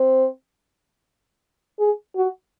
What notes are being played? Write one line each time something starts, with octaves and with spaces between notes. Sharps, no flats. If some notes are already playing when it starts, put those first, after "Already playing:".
Already playing: C4
G#4
F#4